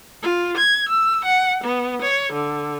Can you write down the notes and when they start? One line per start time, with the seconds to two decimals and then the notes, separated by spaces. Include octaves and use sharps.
0.23 F4
0.57 G#6
0.90 E6
1.25 F#5
1.64 B3
2.01 C#5
2.33 D3